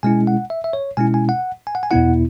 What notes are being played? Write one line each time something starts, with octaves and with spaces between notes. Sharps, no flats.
B2 G#3 C#4 E4 G#5
F#5
E5
E5
C#5
B2 G#3 C#4 E4 G#5
G#5
F#5
G#5
F#5
G#5
E2 B2 B3 E4 F#5